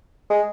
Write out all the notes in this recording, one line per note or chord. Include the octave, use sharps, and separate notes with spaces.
G#3